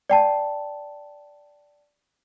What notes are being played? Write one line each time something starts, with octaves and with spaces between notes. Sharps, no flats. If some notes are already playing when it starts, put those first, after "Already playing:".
D5 G5 A5